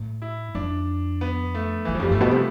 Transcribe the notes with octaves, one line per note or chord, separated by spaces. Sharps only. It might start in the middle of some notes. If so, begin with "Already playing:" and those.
Already playing: A2
E4
F2 D4
B3
A3
E2 E3
F3
F2 G3
G2 A3
B2 B3
C3